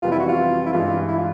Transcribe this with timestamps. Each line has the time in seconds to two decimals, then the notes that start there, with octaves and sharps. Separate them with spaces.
0.02 F2 C3 E3 G3 B3 F4
0.12 E4
0.19 F#4
0.29 F4
0.66 E4
0.73 G2 E3 G#3 F4
1.08 E4
1.18 F4